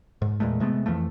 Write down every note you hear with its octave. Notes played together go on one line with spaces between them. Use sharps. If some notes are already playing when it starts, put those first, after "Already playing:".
G#2
E2 A#2 G#3 A3
C3 G#3 A3 B3
F2 E3 F3 A3